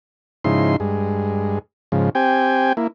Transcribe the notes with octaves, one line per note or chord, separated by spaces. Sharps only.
G#2 C#3 F3 D#4 E4 C6
G2 G#3
G#2 C#3 F3
C4 G4 G5 G#5
A#3 E4